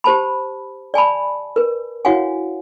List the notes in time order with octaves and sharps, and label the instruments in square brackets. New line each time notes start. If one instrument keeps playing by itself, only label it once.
[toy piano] G4 C5 A5 B5
D5 G#5 A5 B5
A#4 B4
E4 F#4 C#5 F5 F#5 G#5